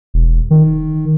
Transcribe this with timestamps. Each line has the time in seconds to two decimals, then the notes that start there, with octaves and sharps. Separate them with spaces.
0.14 E1
0.50 D#3